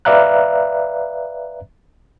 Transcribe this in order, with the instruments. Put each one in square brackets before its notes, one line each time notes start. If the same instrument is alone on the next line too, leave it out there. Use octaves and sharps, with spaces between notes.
[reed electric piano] B4 D5 E5 F5 A#5 F#6